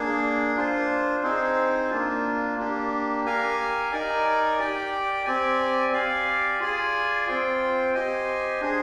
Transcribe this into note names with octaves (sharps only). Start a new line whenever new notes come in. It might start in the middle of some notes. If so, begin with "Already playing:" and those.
Already playing: A#3 D4 G#4
D4 F4 C5
C4 D#4 G#4 C5
A#3 D4 F4
A#3 D4 G4
G4 A#4 F5 G#5
D#4 A#4 D5 G#5
G4 D5 G5
C4 G4 D5 G#5
G4 D5 F5 G#5
F4 G#4 D5 G#5
C4 F4 C5 G5
G4 C5 D#5 G#5
D4 G#4 C5